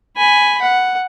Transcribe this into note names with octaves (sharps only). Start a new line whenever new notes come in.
G#5 B5
F#5